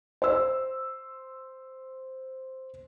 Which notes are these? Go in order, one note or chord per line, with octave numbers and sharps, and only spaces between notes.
C5 E6